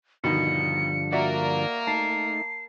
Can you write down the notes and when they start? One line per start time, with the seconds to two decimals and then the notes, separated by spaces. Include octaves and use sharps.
0.24 G2 B2 D3 D#3 F3 C#7
1.12 A#3 F#4 A#4 D5 E5
1.87 A3 D#4 A5 C7